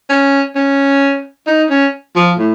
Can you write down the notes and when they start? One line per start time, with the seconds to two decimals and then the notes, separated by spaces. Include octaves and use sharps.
0.10 C#4
0.56 C#4
1.47 D#4
1.70 C#4
2.16 F3
2.38 A2